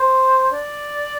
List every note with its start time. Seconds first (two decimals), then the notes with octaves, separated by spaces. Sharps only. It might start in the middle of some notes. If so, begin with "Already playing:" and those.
Already playing: C5
0.53 D5